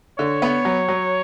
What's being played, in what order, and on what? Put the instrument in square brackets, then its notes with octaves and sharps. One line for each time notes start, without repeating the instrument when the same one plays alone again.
[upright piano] D3 [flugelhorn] C#5
[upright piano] B3
F#3
F#3